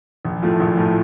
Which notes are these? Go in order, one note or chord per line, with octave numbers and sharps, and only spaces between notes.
A#1
A2 F3 A3
A#1
A2 F3 A3